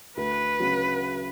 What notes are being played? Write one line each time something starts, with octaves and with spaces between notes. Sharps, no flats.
D2 B4
C#3 F#3